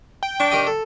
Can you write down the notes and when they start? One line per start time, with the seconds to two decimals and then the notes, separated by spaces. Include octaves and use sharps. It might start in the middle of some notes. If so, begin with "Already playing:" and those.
0.23 G5
0.40 D4 A5 C#6
0.52 D#3 G4 D#5
0.67 A4